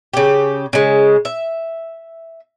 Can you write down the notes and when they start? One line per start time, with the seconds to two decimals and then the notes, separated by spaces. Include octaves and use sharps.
0.13 C#3 G4
0.73 C#3 G#3
1.25 E5